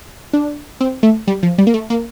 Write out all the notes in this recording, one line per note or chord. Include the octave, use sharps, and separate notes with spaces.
D4
C4
A3
G3
F3
G3
A#3
A3
A#3